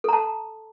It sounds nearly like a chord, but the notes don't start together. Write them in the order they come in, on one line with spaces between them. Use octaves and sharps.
A4 A#5 A5